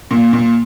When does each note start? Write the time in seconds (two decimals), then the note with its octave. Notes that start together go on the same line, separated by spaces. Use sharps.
0.11 A#2
0.33 A#2